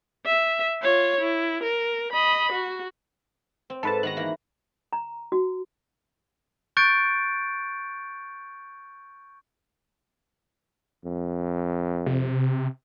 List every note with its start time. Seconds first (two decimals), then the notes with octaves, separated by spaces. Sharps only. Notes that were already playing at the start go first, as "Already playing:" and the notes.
0.26 E5
0.82 F4 C#5
1.20 E4
1.63 A#4
2.12 D#5 B5
2.52 F#4
3.70 C4
3.83 G#2 A4 B4 A5
4.03 D#3 B3 F#4 F#6 A#6
4.17 E3 A#3
4.93 A#5
5.32 F#4
6.77 C#6 F#6 G6 A6 C#7 D7
11.05 F2
12.06 C3